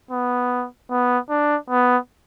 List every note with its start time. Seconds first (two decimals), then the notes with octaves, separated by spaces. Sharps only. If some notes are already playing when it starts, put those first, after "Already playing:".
0.11 B3
0.91 B3
1.30 D4
1.70 B3